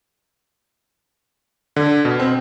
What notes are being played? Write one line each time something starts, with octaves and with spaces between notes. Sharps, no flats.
D3
B2
C4